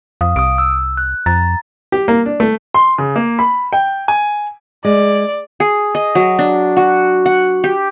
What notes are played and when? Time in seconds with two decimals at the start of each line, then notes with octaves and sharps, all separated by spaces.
0.21 F2 F5 D#6
0.36 C2 D#6 D7
0.58 E6
0.97 F#6
1.26 F2 A#5 A6
1.92 G4
2.08 A#3
2.26 D4
2.40 A3
2.74 C6
2.98 C#3
3.16 A#3
3.39 B5
3.73 G5
4.08 G#5
4.85 G#3 D5
5.60 G#4
5.95 D#5
6.15 F#3
6.39 D4
6.77 F#4
7.26 F#5
7.64 G4